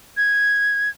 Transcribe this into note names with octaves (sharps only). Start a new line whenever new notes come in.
G#6